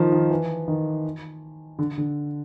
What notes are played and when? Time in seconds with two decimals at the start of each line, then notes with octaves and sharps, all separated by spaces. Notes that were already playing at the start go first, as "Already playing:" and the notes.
Already playing: D#3 F3
0.12 D#3
0.31 E3
0.68 D#3
1.79 D3
1.98 D3